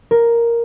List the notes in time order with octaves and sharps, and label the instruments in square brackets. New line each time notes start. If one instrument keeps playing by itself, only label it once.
[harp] A#4